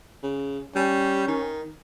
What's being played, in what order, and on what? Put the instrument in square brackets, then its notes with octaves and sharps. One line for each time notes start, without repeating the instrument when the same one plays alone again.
[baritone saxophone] C#3
[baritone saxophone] G3 [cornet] C#4
[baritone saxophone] D#3